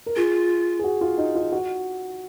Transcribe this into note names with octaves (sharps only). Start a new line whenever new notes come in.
A#4
F4 G#4
G#4
F#4
F4
D#4
F4
F#4